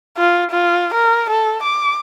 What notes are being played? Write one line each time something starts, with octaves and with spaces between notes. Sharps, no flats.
F4
F4
A#4
A4
D6